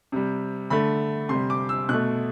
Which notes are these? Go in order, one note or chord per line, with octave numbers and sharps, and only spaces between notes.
C3 G3
D3 A3 B5
C3 C6
G3
D6
E6
B2 A3 F#6